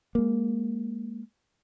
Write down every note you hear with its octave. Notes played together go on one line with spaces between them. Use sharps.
G#3 A#3